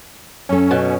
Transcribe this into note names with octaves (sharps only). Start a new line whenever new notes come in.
F#2 C#4 A4
B2